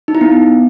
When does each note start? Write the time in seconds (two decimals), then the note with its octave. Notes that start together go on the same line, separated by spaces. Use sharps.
0.08 D#4
0.15 E4
0.21 B3